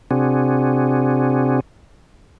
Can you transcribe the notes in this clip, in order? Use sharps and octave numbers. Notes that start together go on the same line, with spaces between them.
C3 C4 D4 F#4 G#4